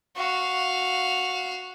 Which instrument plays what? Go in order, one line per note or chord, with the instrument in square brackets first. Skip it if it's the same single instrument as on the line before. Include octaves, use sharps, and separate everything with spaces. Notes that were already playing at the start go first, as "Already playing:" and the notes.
[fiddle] F#4 F5